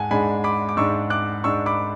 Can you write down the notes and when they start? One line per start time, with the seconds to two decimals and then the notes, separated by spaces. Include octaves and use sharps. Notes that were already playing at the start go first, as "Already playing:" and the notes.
Already playing: G#2 F#5 G#5 A5
0.11 G#2 G#3 D4 G#5 B5
0.44 B5 D6
0.69 D6
0.77 G#2 G#3 D4 C#6 E6
1.10 D6 F#6
1.44 G#2 G#3 D4 C#6 E6
1.66 B5 D6